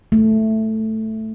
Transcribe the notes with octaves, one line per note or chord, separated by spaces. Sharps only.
A3